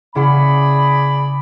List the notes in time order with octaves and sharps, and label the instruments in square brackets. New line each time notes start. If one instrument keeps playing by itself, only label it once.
[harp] C#3 E4 F#5 [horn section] G#4 D5 B5